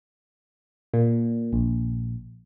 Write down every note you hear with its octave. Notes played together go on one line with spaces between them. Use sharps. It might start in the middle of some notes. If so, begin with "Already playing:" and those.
A#2
A#1